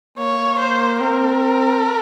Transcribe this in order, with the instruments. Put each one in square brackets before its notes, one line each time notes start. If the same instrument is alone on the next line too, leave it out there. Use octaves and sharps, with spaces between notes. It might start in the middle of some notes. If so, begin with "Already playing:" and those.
[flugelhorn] A#3 [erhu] C#5
[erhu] C5
[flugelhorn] C4 [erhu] A#4